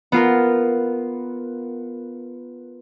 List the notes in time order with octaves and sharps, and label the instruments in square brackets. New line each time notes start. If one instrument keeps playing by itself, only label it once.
[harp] B3 F4 A#4